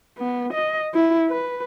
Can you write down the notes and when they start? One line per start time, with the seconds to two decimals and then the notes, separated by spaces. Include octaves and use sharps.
0.18 B3
0.53 D#5
0.94 E4
1.29 B4